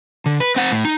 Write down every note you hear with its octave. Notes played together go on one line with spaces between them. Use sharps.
D3
B4
C4 F#5
A2
D#4